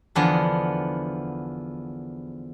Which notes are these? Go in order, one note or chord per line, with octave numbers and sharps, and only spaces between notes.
E2 D3 F3 B3